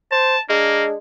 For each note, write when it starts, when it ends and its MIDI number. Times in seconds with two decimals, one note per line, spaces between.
0.11 0.36 72
0.11 0.41 81
0.49 0.96 56
0.49 0.85 58
0.49 0.95 62